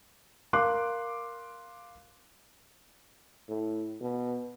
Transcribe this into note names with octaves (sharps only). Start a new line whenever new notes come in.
A#4 F5 C6 D6 F#6
A2
B2